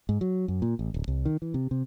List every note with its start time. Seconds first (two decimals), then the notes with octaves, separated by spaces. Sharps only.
0.09 G#2
0.21 F#3
0.48 F#2
0.62 A#2
0.79 A1
0.94 D1
1.08 C2
1.25 D#3
1.42 E3
1.54 C3
1.71 C3